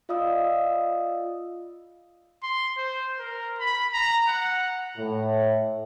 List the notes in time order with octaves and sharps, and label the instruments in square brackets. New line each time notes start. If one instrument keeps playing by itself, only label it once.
[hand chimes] F4 D5 D#5 F5 D#6 E6
[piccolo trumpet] C6
C5
A#4
B5
A#5
F#5
[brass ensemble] A2